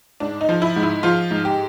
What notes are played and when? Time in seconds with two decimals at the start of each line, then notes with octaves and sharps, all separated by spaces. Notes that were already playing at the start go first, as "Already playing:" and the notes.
0.20 G#2 D4
0.41 D#4
0.49 F3
0.62 E4
0.76 G#2
0.83 E4
1.03 F3 F4
1.31 G#2
1.45 G4